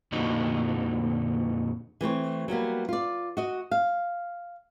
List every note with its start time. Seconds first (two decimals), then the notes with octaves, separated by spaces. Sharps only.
0.12 F2 A#2 D3 F#3 D#4
2.01 E3 A3 C4 C#5
2.48 F#3 G3 A#3 B3
2.89 F4 D5
3.37 F#4 D#5
3.71 F5